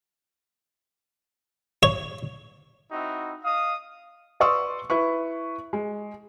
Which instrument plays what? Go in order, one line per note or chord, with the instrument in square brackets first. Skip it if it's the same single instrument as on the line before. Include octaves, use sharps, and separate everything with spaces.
[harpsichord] C#5
[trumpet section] C4 D#4 E4 F#4 E5
D#5 F5 D#6
[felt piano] B4 D5 C6 C#6 D#6 E6
E4 B4 C#6
G#3